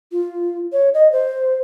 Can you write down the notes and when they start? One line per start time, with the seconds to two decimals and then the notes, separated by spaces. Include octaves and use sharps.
0.12 F4
0.73 C#5
0.94 D#5
1.12 C5